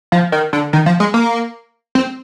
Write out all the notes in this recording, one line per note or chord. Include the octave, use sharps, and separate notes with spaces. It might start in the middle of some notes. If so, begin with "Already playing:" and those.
F3
D#3
D3
D#3
F3
G#3
A#3
C4